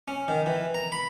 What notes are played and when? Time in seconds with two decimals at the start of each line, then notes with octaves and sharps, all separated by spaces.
0.08 C#4
0.28 D#3
0.46 E3
0.74 A#5
0.92 B5